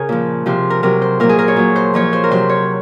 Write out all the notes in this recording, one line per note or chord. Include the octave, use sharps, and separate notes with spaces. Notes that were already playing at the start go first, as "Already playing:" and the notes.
Already playing: C#3 G#4 A#4 C#5
A#2 F3
C3 F3 C5
A#4
C3 F#3 A#4
C5
A#2 F#3 A#4
G#4
A#4
C#5
A#2 F#3
C5
A#2 F3 C#5
C5
A#4
C3 F#3 C5
C#5